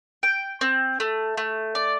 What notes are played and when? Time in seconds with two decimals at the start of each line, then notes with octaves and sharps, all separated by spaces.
0.23 G5
0.61 C4
1.00 A3
1.37 A3
1.75 D5